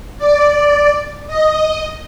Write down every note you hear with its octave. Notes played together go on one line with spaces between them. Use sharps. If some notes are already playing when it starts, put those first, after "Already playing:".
D5
D#5